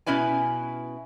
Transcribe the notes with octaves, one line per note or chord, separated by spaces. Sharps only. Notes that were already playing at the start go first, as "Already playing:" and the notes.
B2 C#4 E4 B4 G#5